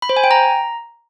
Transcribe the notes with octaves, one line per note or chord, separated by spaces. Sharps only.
B5
C5
G#5
G5
A#5